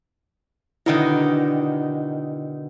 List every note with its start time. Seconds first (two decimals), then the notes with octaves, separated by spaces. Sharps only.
0.86 B2 D3 D#3 E4